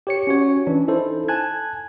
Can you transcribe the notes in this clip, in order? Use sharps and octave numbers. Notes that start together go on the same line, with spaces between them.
G4 C#5 C#7
C#4 F#4 C#5
E3 C#4 D4
D#4 E4 A4 C5
G#5 A5 F#6 G#6